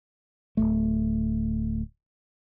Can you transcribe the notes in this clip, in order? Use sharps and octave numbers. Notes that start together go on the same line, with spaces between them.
D1 G1 A3